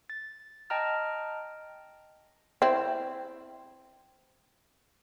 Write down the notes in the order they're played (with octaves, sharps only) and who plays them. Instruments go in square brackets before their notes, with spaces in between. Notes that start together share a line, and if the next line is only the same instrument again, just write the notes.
[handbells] A6
D#5 G5 A5 A#5 F6
[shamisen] C4 E4